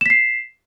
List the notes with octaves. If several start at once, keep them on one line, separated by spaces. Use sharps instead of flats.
B6 C7 E7